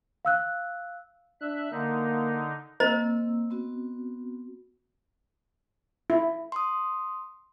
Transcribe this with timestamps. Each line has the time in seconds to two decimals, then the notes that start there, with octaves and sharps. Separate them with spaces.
0.25 F5 E6 F#6
1.41 D4 E5 F#6
1.72 D3 A#3 D#4
2.80 A#3 C4 C5 D#5 A#5 E6
3.50 B3 C4 F#4
6.10 E4
6.52 C6 D#6